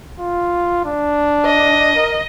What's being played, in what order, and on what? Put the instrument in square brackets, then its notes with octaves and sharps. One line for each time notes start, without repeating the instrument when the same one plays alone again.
[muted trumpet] F4
D4
[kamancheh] D#5
[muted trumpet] A#4